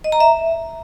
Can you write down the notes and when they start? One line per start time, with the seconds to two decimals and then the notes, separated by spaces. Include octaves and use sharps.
0.04 D#5
0.12 A#5
0.20 E5